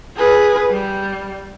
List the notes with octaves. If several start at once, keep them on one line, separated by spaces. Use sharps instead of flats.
G#4 B4
G3